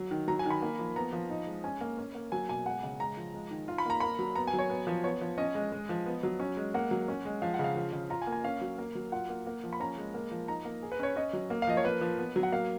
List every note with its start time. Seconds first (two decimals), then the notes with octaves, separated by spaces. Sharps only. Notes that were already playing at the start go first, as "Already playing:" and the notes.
Already playing: F#3
0.11 D#3
0.28 F#3 A#5
0.39 G#5
0.45 D#3
0.50 B5
0.62 A#3
0.79 F3
0.96 B3 A#5
1.13 F3
1.30 D#4
1.47 G#3
1.64 C#4 G#5
1.81 A#3
1.98 C#4
2.15 A#3
2.32 F#3 G#5
2.49 B2 G#5
2.66 G#3 F#5
2.83 C#3
3.00 G#3 A#5
3.17 F3
3.34 G#3
3.51 D#3
3.68 F4
3.78 B5
3.86 A#3 A#5
4.00 A#3 B5
4.19 F#3
4.35 B3 A#5
4.47 G#5
4.53 F#3
4.59 C#5
4.70 B3
4.87 F3
5.04 B3 C#5
5.21 F3
5.38 C#4 D#5
5.55 G#3
5.72 G#3
5.89 F3
6.06 B3
6.23 F#3
6.40 C#4
6.57 G#3
6.74 A#3 F#5
6.91 F#3
7.08 C#4
7.25 G#3
7.42 F3 F5
7.54 F#5
7.59 C#3
7.64 F5
7.76 F3
7.93 C#3
8.10 F4 A#5
8.22 G#5
8.27 A#3
8.32 G#5
8.44 C#4 F5
8.61 F#3
8.78 A#3
8.95 F#3
9.12 F4 F#5
9.29 A#3
9.46 A#3
9.64 F3
9.73 B5
9.80 C#4 A#5
9.98 G#3
10.14 A#3
10.31 F3
10.48 D#4 A#5
10.65 A#3
10.82 G#4
10.92 B4
10.99 C#4 C#5
11.16 C#4 D#5
11.33 F#3
11.50 A#3
11.62 F5
11.67 F3 D#5
11.77 C#5
11.85 A#3 B4
12.01 F3
12.18 B3
12.36 F#3
12.43 F#5
12.52 A#3 F5